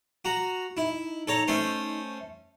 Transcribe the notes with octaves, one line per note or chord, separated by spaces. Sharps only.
F#4 A#5
D#4 E4
A4 C#5 A#5
A3 C#4 C5